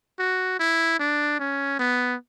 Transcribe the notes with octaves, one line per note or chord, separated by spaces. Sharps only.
F#4
E4
D4
C#4
B3